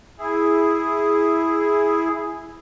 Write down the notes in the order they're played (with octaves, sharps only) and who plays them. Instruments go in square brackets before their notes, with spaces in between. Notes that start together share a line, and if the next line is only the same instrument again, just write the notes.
[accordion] E4 G#4